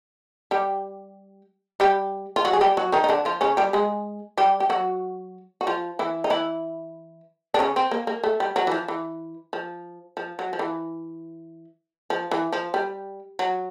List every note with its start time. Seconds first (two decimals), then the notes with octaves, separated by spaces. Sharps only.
0.51 G3 G4
1.80 G3 G4
2.36 F4
2.45 F#3 F#4
2.53 G#4
2.61 G3 G4
2.77 F#3 F#4
2.92 D#3 D#4
3.04 D#4
3.09 D3 D4
3.25 F3 F4
3.41 C#3 C#4
3.57 G3 G4
3.73 G#3 G#4
4.38 G3 G4
4.60 G4
4.70 F#3 F#4
5.61 F#4
5.67 F3 F4
5.99 E3 E4
6.24 D#4
6.30 E3 E4
7.54 D4
7.59 C#3 C#4
7.76 C4
7.91 A#3
8.07 A#3
8.24 A3
8.40 G3
8.56 F#3
8.67 E3
8.72 F3
8.88 E3
9.53 F3
10.17 F3
10.39 F#3
10.53 F3
10.59 E3
12.10 F3
12.31 E3
12.53 F3
12.74 G3
13.39 F#3